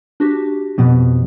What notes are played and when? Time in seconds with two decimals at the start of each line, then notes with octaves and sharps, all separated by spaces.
0.20 D4 F#4 G4
0.78 F2 B2